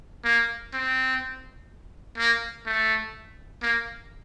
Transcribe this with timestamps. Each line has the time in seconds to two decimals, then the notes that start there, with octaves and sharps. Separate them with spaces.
0.25 A#3
0.73 C4
2.18 A#3
2.66 A3
3.62 A#3